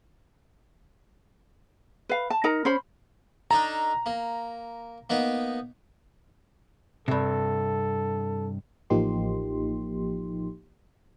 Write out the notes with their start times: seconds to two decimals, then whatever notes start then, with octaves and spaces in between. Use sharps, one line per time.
2.09 B4 F5
2.30 A5
2.44 D#4 A#4 A#5
2.65 C#4 C5 B5
3.51 D4 D#4 A4 A#5
4.06 A#3
5.10 A#3 B3 D#4
7.08 G2 C3 A4
8.90 A1 F3 A#3 D#4 G4 C6